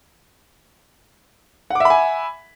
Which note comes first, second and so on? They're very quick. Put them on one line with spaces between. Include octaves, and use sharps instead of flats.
F#5 D6 E5 B5 G#5